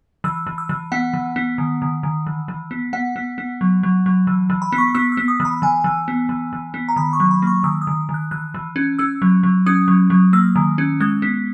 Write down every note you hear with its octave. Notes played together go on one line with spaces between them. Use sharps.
E3 E6
E3
E6
E3
B3 F#5
E3
B3
D#3
D#3
D#3
E3
E3
B3
B3 F#5
B3
B3
F#3
F#3
F#3
E3
E3
B5
B3
C#6
B3 E6
E6
B3
D#6
E3
B5
E3 G#5
E3
B3
E3
E3
B3
A#5
D#3 B5
C#6
F#3
B5
A#3 C#6
D#3 E6
D#6
D#3
D#3
F#6
E3 F#6
E3
C#4
C#4 E6
F#3
F#3
C#4 D#6
F#3
F#3
A#3 E6
D#3
C#4
G#3 F#6
B3